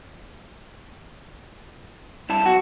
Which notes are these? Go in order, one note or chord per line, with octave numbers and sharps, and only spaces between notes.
G2 E4 A5
B1 F#4